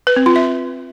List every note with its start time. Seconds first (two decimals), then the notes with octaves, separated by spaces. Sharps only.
0.07 B4
0.16 C4
0.26 F4
0.36 E5